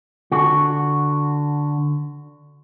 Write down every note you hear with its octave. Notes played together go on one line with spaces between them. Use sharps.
D3 F#4